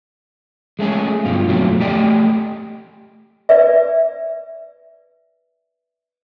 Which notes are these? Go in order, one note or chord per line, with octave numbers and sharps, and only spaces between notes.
G#3 A3 C#4 G#4
G2 B2 F4
F2 B2 F#3 A3
A3 G4 D5 D#5
B4 D5 E5